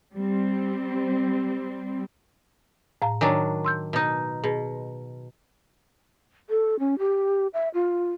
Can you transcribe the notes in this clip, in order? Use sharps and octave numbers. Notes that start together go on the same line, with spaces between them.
G3 C4
A2 F5 A#5
D#3 F#3 D4 G#5
C6 E6 G6
B2 D#4
B2 G#4
A4
C#4
G4
E5
F4